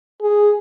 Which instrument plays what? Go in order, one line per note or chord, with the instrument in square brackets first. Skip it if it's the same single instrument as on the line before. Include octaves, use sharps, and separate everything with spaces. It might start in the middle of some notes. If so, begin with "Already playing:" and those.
[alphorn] G#4